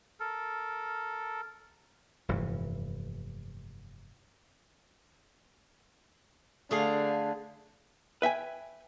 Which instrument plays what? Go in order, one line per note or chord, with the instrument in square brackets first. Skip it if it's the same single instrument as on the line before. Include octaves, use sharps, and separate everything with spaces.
[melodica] A4 A#4
[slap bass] F1 G2 A#2 E3
[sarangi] D3 [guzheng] A3 G#4 F5
[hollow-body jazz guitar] B4 E5 G5 G#5